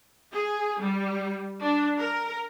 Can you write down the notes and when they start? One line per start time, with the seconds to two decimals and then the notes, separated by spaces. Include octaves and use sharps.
0.32 G#4
0.81 G3
1.61 D4
1.99 A#4